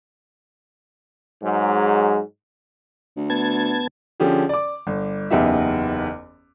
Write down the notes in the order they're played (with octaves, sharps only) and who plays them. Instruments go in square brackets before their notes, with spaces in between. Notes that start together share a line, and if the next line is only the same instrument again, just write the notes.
[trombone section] G#2 F#3 G#3
[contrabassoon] D2
[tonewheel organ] B3 A5 G#6
[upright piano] D3 F3 C#4 G4 G#4
D5 D6
G1
F#1 E2 B3 D#4 G4 E5